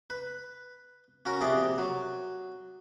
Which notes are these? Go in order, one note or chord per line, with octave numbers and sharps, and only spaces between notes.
B4
C#4 F#4 A#4
A#1 C3 G#4 D5
F#3